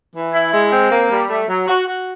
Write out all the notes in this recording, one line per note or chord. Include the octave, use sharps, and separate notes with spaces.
E3
E4
G#3
C4
A#3
G3
A3
F#3
F#4
F#4